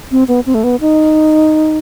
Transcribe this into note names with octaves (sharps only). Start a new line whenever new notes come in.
C4
B3
C4
A3
B3
D#4